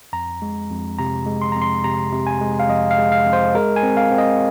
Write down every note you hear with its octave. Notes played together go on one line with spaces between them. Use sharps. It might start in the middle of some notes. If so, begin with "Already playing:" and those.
F2 A#5
G#3
F2
C3 A#5
G#3
C6
F2 A#5
C6
C3 A#5
C3
G#5
G#3
F5
F2 D#5
F5
G#3
F5
F2
C5
G#3 A#4
G#5
C4
F5
C4
D#5